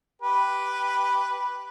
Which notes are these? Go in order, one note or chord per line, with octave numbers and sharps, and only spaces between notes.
G4 B4